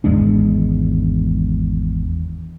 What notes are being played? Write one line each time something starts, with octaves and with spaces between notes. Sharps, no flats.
G#1 E2 G#3 D4